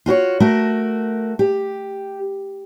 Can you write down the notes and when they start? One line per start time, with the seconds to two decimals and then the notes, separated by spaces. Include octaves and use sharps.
0.06 F4 F#4 C5 C#5
0.40 A3 F#4 A#4
1.39 G4